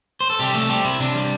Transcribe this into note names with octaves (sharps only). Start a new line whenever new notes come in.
C5
A4
C3 G3 G4
G3 A3 A4
G3 C4 G4
C3 E4
C3 D4
G3